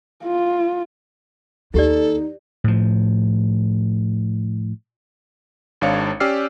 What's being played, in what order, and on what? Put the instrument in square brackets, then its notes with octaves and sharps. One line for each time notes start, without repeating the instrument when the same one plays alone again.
[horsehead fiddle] F4
[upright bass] D#2 [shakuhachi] D#4 [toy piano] E4 G4 D5 [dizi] A4
[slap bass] A2 F3
[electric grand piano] G#1 G#3 D4 C#5 F5 C#7
C#4 G4 D5 E6 F6 C7